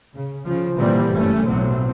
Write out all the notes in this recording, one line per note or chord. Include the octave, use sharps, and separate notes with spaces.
C#3
C#3 F3
A#2 D3 E3 G3 A#3 C4
F#1 G2 A3 C#4
B1 A2 F#3 C4